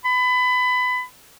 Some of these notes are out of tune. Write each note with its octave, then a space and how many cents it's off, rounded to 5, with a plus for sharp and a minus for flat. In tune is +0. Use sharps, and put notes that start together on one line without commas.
B5 +25